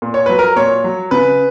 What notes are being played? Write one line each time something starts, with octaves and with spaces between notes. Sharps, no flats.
A#2
C#5
F#3 B4
A#4
A#2 C#5
F#3
C#3 B4